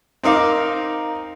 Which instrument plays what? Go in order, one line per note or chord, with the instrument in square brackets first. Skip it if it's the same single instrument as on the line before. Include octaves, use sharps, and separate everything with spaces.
[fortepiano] C4 D#4 A#4 F5 D6